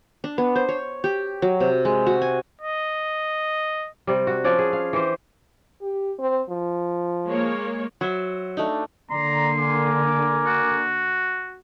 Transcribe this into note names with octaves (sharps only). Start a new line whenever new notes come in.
D4
B3
C5
C#5
G4
F#3
C3
G#3
F#4
G#5
D#5
C3 G3
F#4
F3 C#4 D5 F#5
G#4
F5
E3 G4 C5
G4
C4
F3
G#3 A#3 C#5
F#3 F#4 C5 E5
A3 D4 D#4
D3 A#3 D5 A#5 C6
A#4 G#5 D6
F#4